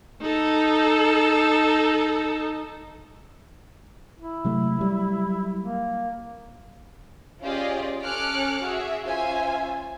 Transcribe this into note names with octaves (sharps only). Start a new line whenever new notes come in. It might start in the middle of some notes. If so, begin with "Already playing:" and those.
D#4 A4
E4
C3 F#3 A3
F#3 G3
A#3
C#4 F4 G4 G#4 D5 D#5
C#4 A4 D6 F6 F#6 C#7
F#4 G#4 E5
C#4 F4 C5 E5 G#5